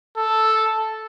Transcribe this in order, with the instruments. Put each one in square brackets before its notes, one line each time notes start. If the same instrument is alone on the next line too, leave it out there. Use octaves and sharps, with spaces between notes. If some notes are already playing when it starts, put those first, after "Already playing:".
[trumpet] A4